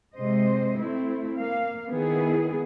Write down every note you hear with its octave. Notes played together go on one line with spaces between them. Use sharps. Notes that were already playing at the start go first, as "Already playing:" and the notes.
C3 G#3 C5 D#5
A3 C4 E4
A#3 F5
D#3 B3 E4 G#4